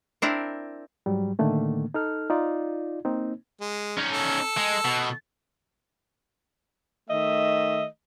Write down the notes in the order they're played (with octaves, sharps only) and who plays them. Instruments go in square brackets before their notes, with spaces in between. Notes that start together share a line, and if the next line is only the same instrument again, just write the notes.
[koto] C4 D4 E4 A#4
[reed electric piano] G#2 F#3 G3
A2 D3 D#3 A3 A#3
D#4 A4 F6
D#4 F4 D5
A#3 C4 D#4
[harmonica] G#3
[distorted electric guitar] C#4 D#4
[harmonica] A4
[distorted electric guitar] G#3
B2
[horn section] D#3 A3 D#5 E5